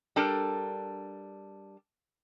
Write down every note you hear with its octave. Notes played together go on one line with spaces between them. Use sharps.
G3 D4 A4 A#4